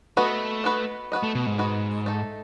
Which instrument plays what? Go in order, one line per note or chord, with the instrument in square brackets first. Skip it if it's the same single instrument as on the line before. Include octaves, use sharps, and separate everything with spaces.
[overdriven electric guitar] A3 [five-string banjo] B3 F#4 B4 D#5
[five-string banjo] B3 F#4 B4 D#5
B3 F#4 B4 D#5
[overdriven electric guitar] A3
B2
G#2
[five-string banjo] B3 F#4 B4 D#5
A3 D#4 A4